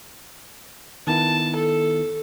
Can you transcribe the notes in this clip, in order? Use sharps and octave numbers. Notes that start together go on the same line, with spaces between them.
D#3 B3 E4 A5
A4